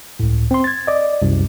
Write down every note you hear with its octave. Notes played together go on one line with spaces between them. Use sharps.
C#2 A2
C4 C6
G#6 A6
D5 D#5
C2 F#2